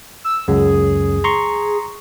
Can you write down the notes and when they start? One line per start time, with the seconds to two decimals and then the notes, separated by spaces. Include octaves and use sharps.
0.24 E6
0.48 C#2 F#2 G#4
1.24 A#5 C6 C#6